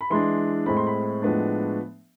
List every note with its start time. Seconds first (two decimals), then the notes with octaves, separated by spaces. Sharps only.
0.01 B5
0.10 E3 G#3 D4 C6
0.66 A2 G#3 C4 B5
0.77 C6
0.87 B5
1.22 A2 F3 G#3 B3 D4